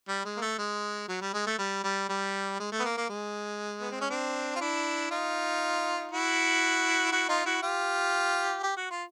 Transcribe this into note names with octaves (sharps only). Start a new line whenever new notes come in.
G3
G#3
A#3
A3
G#3
F#3
G3
G#3
A3
G3
G3
G3
G#3
A3
B3
A#3
A#3
G#3
B3
C4
C#4
C4 D4
F4
D4 E4
D#4 F4
E4 F#4
E4 F#4
D#4 F4
E4 F#4
F4 G4
G4
F#4
F4